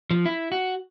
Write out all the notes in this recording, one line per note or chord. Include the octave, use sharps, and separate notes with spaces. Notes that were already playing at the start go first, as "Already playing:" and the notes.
F3
E4
F#4